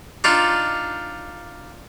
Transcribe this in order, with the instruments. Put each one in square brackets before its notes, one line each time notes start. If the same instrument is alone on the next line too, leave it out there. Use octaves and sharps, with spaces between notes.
[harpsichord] D4 D#4 F4